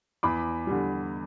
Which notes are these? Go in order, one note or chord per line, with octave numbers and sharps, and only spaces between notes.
E2 B5 D6
D3 G3